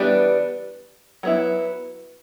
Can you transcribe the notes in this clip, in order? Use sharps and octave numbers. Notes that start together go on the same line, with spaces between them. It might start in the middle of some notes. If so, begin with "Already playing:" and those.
Already playing: E3 G3 B3 D4 G4
F#3 B3 E4